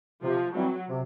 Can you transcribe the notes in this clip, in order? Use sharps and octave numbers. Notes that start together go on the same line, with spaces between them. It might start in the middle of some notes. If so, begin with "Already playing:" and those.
C3 F3
E3 F#3 G3 C4
C3